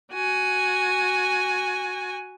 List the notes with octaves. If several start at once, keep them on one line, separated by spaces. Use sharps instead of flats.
F#4 G#5